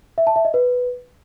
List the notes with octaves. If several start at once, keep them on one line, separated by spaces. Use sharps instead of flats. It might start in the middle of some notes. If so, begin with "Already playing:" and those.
E5
A5
E5
D#5
B4